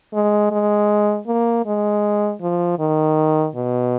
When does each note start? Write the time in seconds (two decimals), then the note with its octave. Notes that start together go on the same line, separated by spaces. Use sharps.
0.14 G#3
0.52 G#3
1.27 A#3
1.66 G#3
2.41 F3
2.79 D#3
3.55 B2